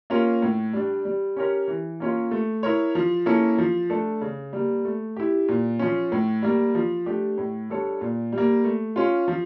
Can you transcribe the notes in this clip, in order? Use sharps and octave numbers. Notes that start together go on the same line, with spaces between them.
A#3 C#4 F4 A#4
A2
G3 D4
G3
C#4 G4 A#4 C#5
E3
A#3 C#4 F4 C#5
A3
E4 A#4 C#5
F3
A#3 C#4 E4 A4
F3
A3 D4 A4
C#3
G3 A#3
A3
E4 G4
A#2
F3 C#4
A2
G3 A#3
F3
A3 D4 G4
A2
G3 D4 A4 C#5
A#2
G3
A#3
A3
C#4 F4
F3